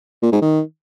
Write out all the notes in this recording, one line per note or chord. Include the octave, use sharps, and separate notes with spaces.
A#2
G#2
D#3